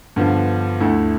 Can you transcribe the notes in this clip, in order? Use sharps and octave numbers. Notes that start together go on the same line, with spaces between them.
G2 D3 F3 B3
D2 D3 A3 E4